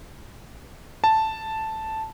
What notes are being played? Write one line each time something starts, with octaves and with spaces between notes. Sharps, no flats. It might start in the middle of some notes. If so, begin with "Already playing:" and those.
A5